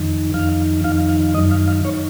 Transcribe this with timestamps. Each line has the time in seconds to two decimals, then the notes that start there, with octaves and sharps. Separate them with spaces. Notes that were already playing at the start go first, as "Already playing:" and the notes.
Already playing: F2 D#3
0.34 F2 D#3 F5
0.84 F2 D#3 F5
1.09 F5
1.34 F#2 D#3 D#5
1.51 F5
1.68 F5
1.85 D#3 C#5